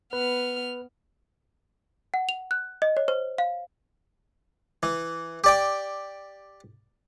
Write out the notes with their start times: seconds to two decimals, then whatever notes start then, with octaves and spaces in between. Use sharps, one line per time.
0.13 B3 B4 F6
2.14 F#5
2.29 F7
2.51 F#6
2.82 D#5
2.97 C#5
3.08 C5
3.38 F5
4.83 E3
5.44 G4 D5 G5